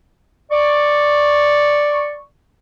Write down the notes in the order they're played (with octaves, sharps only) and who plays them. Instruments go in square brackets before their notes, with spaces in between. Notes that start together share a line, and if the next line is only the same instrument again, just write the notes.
[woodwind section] D5 C#6